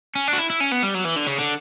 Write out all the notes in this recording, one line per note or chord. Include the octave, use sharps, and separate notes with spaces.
C#4
D4
F#4
E4
E4
C#4
B3
G3
F#3
E3
D3
C#3
D3